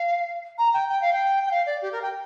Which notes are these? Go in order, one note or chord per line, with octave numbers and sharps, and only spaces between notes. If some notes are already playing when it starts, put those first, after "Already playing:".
Already playing: F5
A#5
G5
G5
F5
G5
G5
F5
D5
G4
A#4
G5